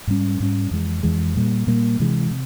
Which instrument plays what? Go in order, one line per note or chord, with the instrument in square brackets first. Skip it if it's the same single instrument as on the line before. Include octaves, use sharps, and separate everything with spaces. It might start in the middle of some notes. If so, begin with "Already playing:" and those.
[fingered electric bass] G#2 G3 C#4
G#2 G3 C#4
F2 E3 G#3
F2 E3 G#3
A#2 G3 A#3
A#2 G3 A#3
C3 E3 G#3
C3